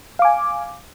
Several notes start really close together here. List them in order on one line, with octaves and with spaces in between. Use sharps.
F5 D6 G#5